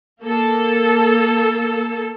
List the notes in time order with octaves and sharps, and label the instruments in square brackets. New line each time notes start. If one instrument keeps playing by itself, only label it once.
[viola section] A#3 A4